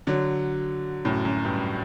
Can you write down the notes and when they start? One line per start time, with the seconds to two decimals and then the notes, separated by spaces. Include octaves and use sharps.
0.07 D3 F#3
1.05 F#2 A2
1.25 F#2
1.44 G2